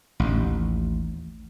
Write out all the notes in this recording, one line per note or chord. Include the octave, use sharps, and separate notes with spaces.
A1 D#2